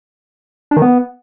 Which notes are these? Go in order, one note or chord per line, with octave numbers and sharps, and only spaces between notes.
D4
D#3
B3